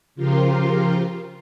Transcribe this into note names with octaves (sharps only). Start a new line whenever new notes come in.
C#3 F3 F4 G4 A#4 C6